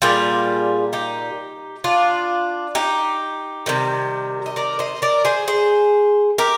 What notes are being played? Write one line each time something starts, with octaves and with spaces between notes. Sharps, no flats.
A#2 G3 F4 G#4
D#4 G4
D4 F4
D#4 G4
C3 D#3 G3
D#5
A#4 D5
C5 D#5
A#4 D5
G#4 C5
G#4 C5
G4 A#4